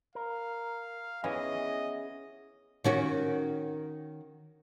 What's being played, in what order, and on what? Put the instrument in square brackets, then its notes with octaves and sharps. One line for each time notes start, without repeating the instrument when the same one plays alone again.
[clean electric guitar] A#4 [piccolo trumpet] F5
[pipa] E3 [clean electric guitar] B3 E5 [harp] C#4 G#4 [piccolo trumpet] D#5
[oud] D#3 C#4 F#4